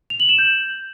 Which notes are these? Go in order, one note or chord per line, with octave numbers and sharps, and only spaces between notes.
F7
F#7
E7
G6